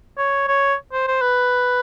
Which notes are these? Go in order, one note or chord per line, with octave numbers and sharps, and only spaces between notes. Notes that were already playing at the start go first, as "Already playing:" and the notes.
C#5
C#5
C5
C5
B4